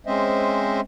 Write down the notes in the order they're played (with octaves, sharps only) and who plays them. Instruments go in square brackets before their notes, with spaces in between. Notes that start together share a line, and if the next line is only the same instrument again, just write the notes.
[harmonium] G#3 C4 C#4 C5 D#5 E5